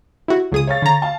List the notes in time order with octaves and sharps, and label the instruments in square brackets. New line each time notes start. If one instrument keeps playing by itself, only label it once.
[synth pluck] E4 F#4
C#2 G#4 D#6
[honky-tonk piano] C#5 F5 A6
[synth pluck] D3 A#5
[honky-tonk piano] F5 A5